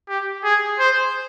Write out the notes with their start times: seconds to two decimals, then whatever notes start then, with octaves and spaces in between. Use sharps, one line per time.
0.09 G4
0.44 G#4
0.79 C5